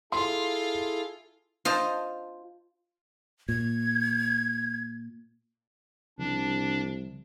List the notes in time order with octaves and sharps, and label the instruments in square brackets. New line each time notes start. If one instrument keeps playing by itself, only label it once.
[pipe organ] E4 G#4 A4 [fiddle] F4 [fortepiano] C6
[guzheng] F4 C5 D#5 A5
[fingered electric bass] A#2 [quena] G#6
[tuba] C2 [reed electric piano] C#3 F3 G3 [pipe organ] D4